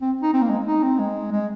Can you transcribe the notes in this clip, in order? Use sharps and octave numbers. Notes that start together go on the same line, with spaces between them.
C4
D#4
C4
A#3
G#3
D#4
C4
G#3
G#3